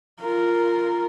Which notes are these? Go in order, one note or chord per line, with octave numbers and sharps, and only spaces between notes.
F4 A#4